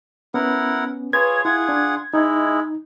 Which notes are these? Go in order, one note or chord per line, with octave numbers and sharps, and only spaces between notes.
B3 C#4 E4 A#4 F#5
F4 G#4 B4 C#5 G#6
E4 F4 G#4 F#5
D4
G#3 D#4 E4